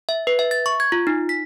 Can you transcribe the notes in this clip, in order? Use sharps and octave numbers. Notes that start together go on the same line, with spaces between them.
E5
B4
E5
A6
C#6
G#6
F4
D#4
B6